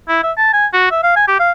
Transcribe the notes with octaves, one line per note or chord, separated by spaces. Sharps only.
E4
E5
A5
G#5
F#4
E5
F5
G#5
G4
F5